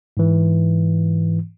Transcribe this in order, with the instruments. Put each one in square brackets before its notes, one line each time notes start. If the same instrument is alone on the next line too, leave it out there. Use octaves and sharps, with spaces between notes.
[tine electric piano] G#2 E3